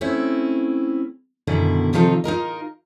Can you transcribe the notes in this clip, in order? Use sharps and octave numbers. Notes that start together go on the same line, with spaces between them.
A3 C4 C#4 E4
F#2 B2 D3 D#3 E4
C3 D#3 F3 D#4 F4 A4
D#4 F4 A#4 D#5